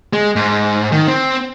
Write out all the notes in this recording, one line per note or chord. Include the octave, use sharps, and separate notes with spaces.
G#3
G#2
D#3
C4